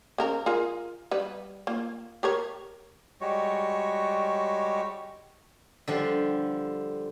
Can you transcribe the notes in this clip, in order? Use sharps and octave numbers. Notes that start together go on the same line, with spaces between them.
C#3 A#4 A#5
F4 G#4 A#4
G3 B4
A#3 F4
G4 A#4 C#5
G3 G#3 F#4 C#5
D3 F3 G3